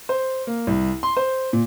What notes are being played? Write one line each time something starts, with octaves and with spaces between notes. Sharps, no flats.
C5
A#3
C2
C6
C5
A#2